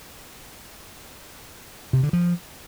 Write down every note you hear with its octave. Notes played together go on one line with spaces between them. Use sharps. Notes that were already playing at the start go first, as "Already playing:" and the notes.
C3
D3
F3